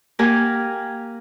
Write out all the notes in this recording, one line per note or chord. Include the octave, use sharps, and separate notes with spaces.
A#3 G4 A#4 F5 F#5 G#5